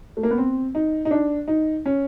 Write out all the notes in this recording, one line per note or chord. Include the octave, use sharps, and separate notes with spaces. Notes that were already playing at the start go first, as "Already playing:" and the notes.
A3
A#3
B3
C4
D#4
D#4
D4
D#4
C#4